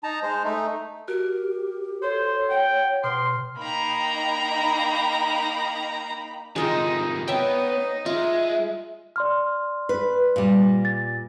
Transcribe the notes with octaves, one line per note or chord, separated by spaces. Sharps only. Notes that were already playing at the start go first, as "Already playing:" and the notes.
D#4 A5 A#5
G#3 C5
A3 D#4
F#4 G4 A#4
A4 C5 C#5
F#5 G5
B2 C6 F6
A#3 D#4 G5 A#5 B5
C3 D#3 G#3 D#4 F4 G5
B3 D#4 C#5 E5 G5
G#3 F4 E5
D5 C6 F6
B4
A#2 G3
A6